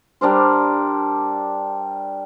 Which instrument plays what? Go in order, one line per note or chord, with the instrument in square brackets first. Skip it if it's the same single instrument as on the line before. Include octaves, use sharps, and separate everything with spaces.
[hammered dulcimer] G3 D4 A#4 C5